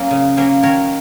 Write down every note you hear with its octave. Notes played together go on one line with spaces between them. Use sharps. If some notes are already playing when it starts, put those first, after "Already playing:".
Already playing: F#3 A#3 C#4
C#3
F#3 A#3 C#4
D#3 A#4 C#5